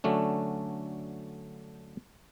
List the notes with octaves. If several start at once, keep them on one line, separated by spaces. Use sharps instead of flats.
D3 F#3 A3 C#4 D4